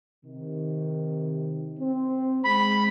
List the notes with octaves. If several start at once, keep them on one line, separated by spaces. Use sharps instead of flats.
C3 D#3
C4
G#3 B5